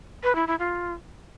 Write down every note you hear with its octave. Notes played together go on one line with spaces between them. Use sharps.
B4
E4
E4
F4